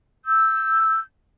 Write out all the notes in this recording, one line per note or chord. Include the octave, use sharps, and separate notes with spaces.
E6 G6